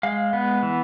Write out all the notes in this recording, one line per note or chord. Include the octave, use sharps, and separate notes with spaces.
G#3 F5
B3
E3